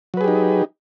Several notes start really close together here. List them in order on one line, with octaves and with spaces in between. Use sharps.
F#3 B4 G#4 G4 D#4